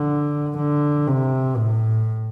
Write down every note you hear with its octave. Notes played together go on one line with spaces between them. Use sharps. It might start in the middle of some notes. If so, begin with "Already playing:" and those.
Already playing: D3
D3
C3
A2